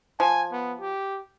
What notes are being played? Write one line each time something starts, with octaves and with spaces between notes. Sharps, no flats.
F3 G#5
B3
G4